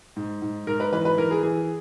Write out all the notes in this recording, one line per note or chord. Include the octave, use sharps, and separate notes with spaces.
G#2
G#2
G#2 A#4
B4
E3 B4
B4
E3 A#4
G#4
E3 G#4